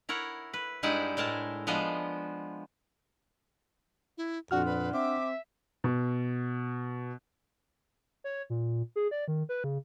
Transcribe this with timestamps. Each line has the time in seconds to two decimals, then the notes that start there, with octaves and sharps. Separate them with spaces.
0.09 E4 A#4 C#5 F#5
0.53 B4
0.83 G2 G#3 D#4 E4 D5 F#5
1.17 A2 G#3 A#4 A5
1.67 F3 G#3 B3 D4 D#5
4.18 E4
4.51 F2 A#2 D4 F#4 F#5 F6
4.66 B4
4.93 C4 E5 D6
5.84 B2
8.24 C#5
8.50 A#2
8.96 G#4
9.11 D5
9.28 D#3
9.49 B4
9.64 C#3